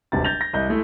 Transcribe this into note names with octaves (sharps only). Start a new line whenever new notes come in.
D1 G1 C3 A5 A6
G6 A6 A#6 F7
A#6
C2 D#5 G6
G#3 A3 E4